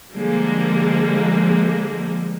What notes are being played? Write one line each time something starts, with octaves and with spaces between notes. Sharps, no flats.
D3 F3 G3 G#3 A#3